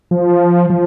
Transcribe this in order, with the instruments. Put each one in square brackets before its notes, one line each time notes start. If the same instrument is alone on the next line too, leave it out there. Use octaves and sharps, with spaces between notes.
[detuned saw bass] F3
F3